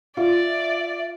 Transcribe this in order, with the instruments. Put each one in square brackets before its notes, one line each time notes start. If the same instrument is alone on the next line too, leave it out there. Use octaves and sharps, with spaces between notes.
[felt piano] F4 [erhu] D5 [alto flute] E5